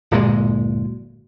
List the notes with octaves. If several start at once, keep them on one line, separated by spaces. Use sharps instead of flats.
D1 G1 A#2 G#3